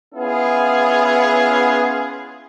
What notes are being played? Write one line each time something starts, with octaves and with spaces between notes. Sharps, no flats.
B3 C#4 E4 F4 G#4